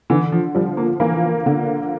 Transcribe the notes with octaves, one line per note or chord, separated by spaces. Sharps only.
D3 E3
F3
F3 G3
A#3
E3 A#3
D3